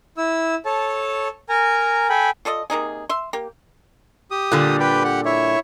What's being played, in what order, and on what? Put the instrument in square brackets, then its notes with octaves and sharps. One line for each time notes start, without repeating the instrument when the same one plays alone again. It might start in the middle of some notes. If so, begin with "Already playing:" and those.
[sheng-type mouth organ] E4 E6
A4 C#5 A5
A#4 G#5 A#5
A4 G5 G#5 B5
[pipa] F4 A4 D5 D#5
C3 A#3 D#4 G#4
E5 C6
A#3 G4
[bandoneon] G4 D#6
[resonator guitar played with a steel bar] A#2 D3 G3
[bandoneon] G4 B4 G5
G4 F#5
E4 C#5 E5